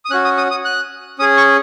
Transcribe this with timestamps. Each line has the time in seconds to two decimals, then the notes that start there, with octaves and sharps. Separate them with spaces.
0.05 D#6
0.10 C#4 F#6
0.14 F#4
0.25 D#6
0.38 D#6
0.51 D#6
0.65 F#6
1.19 C#4 G#4 D#6
1.37 C#6